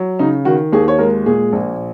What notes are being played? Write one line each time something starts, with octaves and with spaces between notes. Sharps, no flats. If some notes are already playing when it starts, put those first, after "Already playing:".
Already playing: F#3
C#3 D#4
D#3 F#4
D#2 G#4
C#5
G#3 A#4
A#2 G#4
A#1